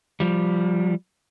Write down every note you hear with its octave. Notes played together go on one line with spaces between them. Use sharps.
F3 G3